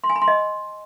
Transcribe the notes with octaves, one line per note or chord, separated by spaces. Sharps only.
C6
G#5
B5
C6
D#5